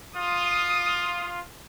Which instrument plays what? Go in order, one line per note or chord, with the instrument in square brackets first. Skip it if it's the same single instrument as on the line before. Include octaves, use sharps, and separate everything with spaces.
[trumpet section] F4 [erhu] D#6